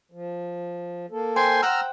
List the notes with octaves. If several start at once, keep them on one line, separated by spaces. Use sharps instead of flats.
F3
A#3 A4
C5 G5 G#5 C6
C5 F#5 G5 A#5 E6 F6